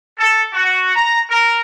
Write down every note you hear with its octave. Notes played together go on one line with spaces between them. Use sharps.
A4
F#4
A#5
A#4